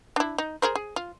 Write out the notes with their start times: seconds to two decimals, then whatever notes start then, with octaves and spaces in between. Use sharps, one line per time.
0.16 D4 E4
0.38 D#4
0.62 G#4 A#4 C5
0.75 G#4
0.96 F4